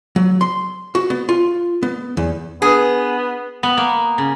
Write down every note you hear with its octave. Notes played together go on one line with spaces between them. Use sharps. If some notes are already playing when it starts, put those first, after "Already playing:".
F#3
C6
F#4
B3
F4
B3
E2
B3 D4 G#4 B4
B3
A#3
C#3